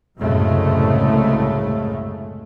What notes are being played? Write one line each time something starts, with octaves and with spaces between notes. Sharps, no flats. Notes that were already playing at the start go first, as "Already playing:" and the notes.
C2 F#2 A2 C#3 G#3 A3